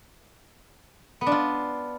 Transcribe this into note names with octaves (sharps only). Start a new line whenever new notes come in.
B3
D4
F4